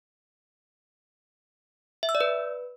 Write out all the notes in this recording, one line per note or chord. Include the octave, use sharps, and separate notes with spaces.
E5
E6
D5
B4